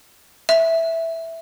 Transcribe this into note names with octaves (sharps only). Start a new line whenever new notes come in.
E5